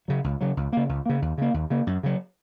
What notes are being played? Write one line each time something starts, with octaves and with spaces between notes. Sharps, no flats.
C#3 F#3
C#2
C#3 F#3
C#2
C#3 A#3
C#2
C#3 A#3
D#2
C#3 A#3
D#2
C#3 A#3
F#2
C#3 F#3